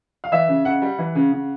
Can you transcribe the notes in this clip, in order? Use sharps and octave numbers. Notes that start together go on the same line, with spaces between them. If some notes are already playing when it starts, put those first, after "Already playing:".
F5
E3 E5
C#3
C#3 F#5
G3
E3
C#3
C#3